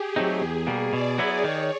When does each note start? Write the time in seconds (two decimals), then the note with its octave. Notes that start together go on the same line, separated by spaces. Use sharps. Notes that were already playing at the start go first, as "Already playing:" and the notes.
Already playing: G4 G#4
0.16 F#3 A3 C4 D#4
0.41 E2
0.67 B2 G3 A#3
0.92 B2 D5
1.18 F#3 B3 E4
1.44 D#3 C#5